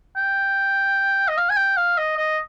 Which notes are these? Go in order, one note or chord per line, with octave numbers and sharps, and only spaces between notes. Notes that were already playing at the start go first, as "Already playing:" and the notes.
G5
D#5
F5
G#5
G5
F5
D#5
D#5